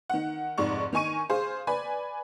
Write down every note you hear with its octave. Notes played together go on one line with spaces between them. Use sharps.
D#3 F#5
F1 G#2 D5 C#6
D#3 D#4 G#5 C#6 D#7
G#4 C5 F5
B4 D5 G#5 B5